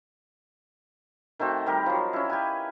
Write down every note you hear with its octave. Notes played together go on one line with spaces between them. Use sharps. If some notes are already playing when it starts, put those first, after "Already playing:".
D#3 A3 C4 F#4
D#3 G3 G4 A#4
F3 F#3
C#4 E4
G4 B4 G#5